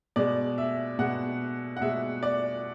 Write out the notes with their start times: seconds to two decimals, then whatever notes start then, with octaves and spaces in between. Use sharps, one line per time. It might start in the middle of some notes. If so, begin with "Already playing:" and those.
0.16 B2 G#3 D5
0.58 E5
0.99 B2 G#3 F#5
1.77 F#5
1.81 B2 G#3 E5
2.23 D5